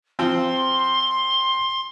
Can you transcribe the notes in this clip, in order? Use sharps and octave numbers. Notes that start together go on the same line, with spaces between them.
F3 C4 C6